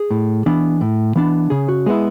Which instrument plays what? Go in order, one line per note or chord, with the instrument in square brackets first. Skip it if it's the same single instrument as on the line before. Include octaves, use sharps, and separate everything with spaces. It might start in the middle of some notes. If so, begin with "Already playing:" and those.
Already playing: [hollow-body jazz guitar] G#4
A2
E3 B3 D4
A2
E3 B3 D4
C#3 G#4
F#4
G#3 B3 E4 G#4